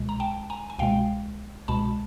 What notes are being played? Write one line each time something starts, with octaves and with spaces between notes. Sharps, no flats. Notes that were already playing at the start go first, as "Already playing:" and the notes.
Already playing: C2 B2 G#3
A#5
G5 A5
G#5 A#5
G#5
C2 B2 G#3 F5 G5
C2 B2 G#3 A5 B5